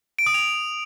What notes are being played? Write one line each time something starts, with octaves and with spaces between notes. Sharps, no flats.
D7
D#6
F7